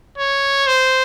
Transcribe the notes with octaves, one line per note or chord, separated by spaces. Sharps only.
C#5
C5